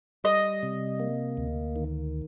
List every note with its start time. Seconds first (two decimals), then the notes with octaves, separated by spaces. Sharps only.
0.24 G3 D#5
0.63 C3
1.00 A#3
1.37 D2
1.76 D#3